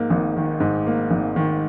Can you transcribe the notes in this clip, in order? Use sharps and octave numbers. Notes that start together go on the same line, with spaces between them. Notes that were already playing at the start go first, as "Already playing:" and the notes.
Already playing: G#2 A#3
G#1
D#3
G#2
A#3
G#1
D#3